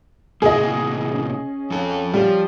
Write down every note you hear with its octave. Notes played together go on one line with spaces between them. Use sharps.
A2 C3 A#3 G#4 D#5
C#4
F2 A4
F3 G3